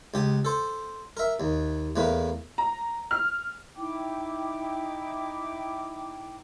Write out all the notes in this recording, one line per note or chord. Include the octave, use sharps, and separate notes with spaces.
C#2 G4 D#6
A4 C5
A#4 E5
D#2
E2 A2 A#3 B4
A#5
F6
D#4 E4 G5 D6